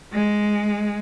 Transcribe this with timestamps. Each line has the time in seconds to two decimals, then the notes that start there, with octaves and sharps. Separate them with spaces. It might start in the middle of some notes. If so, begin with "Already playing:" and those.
0.13 G#3